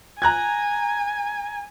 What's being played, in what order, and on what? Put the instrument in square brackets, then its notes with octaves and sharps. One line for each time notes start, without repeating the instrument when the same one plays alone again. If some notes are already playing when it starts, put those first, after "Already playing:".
[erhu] G#5 [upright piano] A#5 F#6 G#6